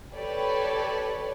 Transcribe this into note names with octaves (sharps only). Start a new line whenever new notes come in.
G4 A4 B4 C#5 D5